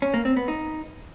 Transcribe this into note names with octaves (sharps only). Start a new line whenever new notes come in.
C#4
A#3
C4
B3
D#4